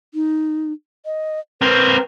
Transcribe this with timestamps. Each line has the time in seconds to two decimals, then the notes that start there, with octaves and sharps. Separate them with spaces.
0.14 D#4
1.05 D#5
1.62 C4 A#4 B4